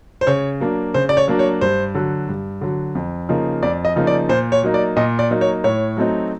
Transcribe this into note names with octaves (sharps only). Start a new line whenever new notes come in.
C5
C#3 C#5
F#3 A#3 D4
C#3 C5
D5
C#5
F#3 A#3 D4
C#5
G2 C5
D3 F#3
G2
D3 F#3
F2
C#3 F3 A#3 D#4
F2 D5
D#5
C#3 F3 A#3 D#4
D5
A#2 C5
C#5
F#3 A#3 D#4
D5
A#2 D#5
D5
F#3 A#3 D#4
C#5
A2 C#5
F#3 A3 C4 D#4